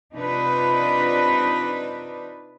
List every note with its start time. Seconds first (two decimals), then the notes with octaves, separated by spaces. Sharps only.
0.14 C3 D4 D#4 F4 B4